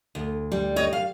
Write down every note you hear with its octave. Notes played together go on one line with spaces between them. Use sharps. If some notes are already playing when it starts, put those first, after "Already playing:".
D2
G3
C#5 D#5
F5